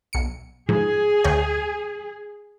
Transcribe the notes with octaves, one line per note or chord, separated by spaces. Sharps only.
B1 C#7
G#2 F3 G#4
D2 C#5 G5